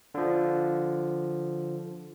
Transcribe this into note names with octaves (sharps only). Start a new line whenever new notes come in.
D3 F3